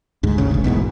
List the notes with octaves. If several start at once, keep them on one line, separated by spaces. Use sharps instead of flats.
D2 G#2
A1 D2 C#3
D#1 G#1
A1 E2 G#2 B2